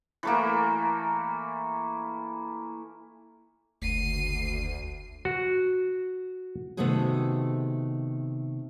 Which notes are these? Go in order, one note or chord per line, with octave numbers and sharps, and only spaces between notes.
E3 A3 A#3
F#1 D2 C7 D#7
F#4
C3 D#3 A3 B3 F#4 G#4